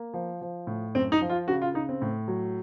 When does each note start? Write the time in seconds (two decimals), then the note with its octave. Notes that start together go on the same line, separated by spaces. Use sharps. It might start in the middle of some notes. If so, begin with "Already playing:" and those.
Already playing: A#3
0.14 F3
0.41 F3
0.67 A2
0.95 F#2 C4
1.12 D#4
1.21 F3
1.30 F4
1.48 C#3 F#4
1.62 F4
1.74 C#3 D#4
1.89 C4
2.02 A2
2.28 F#3